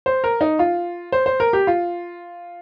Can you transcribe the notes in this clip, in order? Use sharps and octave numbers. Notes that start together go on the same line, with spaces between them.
C5
A#4
D#4
F4
C5
C5
A#4
G4
F4